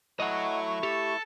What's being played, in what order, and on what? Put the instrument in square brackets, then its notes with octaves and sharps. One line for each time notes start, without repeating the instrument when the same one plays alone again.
[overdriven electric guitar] F#3 [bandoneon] A3 E4 C#6 [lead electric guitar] D#5 F#5
[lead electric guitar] G4 [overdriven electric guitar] A4